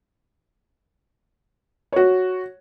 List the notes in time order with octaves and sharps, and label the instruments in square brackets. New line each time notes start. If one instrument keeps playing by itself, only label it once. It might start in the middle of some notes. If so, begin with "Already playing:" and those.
[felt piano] F#4 C#5